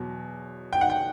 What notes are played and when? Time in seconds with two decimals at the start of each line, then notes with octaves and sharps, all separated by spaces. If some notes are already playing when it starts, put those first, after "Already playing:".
Already playing: E2 B2 F#3
0.73 G5
0.81 F#5
0.90 G5